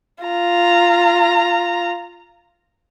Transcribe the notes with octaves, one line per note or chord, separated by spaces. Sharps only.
F4 A#5